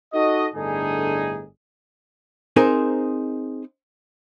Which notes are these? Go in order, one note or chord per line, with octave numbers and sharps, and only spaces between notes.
D#4 F#4 A4 D#5
G1 A2 D3 D#4 G#4
C4 D#4 G#4 A#4 C5